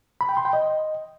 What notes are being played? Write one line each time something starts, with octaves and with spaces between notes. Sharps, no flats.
B5
G5
C6
G5
D#5